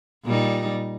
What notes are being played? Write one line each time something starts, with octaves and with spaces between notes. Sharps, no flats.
A#2 G3 D#4